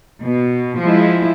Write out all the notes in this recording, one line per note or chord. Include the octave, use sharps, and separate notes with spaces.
B2
F3 G#3 E4